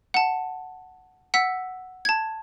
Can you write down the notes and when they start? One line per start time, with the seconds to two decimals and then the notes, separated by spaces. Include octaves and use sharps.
0.14 F#5 A5
1.34 F#5 E6 B6
2.05 A5 G#6